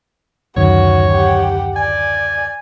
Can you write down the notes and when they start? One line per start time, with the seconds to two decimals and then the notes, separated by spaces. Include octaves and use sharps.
0.57 D1 F#2 D#3 F#4 C#5
1.11 G4 F#5
1.76 D5 G#5